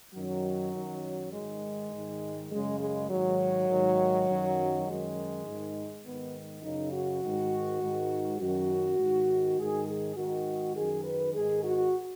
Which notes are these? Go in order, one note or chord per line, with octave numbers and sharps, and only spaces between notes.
F#2 D#3 F#3
F#2 D#3
G#2 D#3 G#3
G#2 D#3
F#2 C#3 G#3
G#3
G#2 D#3 F#3
G#2 D#3
F#2 D#3
F#2 D#3 G#3
G#2 D#3
G#2 D#3 B3
F#2 C#3 D#4
F#4
G#2 D#3
G#2 D#3
F#2 D#3 F#4
G#2 D#3
G#2 D#3 G#4
G#4
G#2 D#3 F#4
F#2 D#3 G#4
B4
G#2 D#3 G#4
F#4